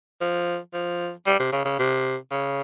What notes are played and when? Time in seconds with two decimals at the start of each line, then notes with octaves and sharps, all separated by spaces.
0.21 F3
0.73 F3
1.26 G3
1.40 C3
1.52 C#3
1.65 C#3
1.79 C3
2.31 C#3